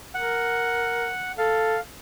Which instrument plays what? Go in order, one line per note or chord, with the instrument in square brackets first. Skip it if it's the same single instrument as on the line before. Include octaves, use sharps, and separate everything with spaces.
[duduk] A#4 [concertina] F#5
[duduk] A4 [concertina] F5